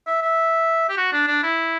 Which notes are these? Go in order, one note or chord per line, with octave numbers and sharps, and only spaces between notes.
E5
E5
G4
F#4
D4
D4
E4